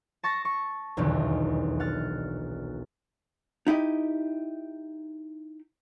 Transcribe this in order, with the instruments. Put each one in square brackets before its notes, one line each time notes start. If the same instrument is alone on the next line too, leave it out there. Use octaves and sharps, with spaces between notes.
[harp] A5 C#6 A6 A#6
C#6
D#1 B1 E2 B2 D3 D#3
F#5 F6 A6
[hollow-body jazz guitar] D#4 E4 G4 D#5